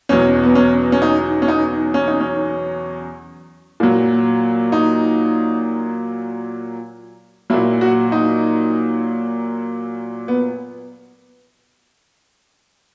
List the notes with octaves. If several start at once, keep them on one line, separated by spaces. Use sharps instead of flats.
E2 B2 F#3 C#4
B3
C#4
C#4
D#4
C#4
D#4
C#4
D#4
C#4
A#2 F#3
D#4
A#2 F#3 E4
F#4
D#4
B3